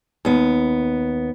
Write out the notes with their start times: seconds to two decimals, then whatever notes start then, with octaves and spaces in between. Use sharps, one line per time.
0.25 D#2 B3